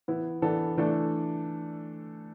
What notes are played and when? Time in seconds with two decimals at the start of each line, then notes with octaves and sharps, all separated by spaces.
0.08 E3 B3 E4
0.42 E3 B3 D4 A4
0.77 E3 A3 D4 A4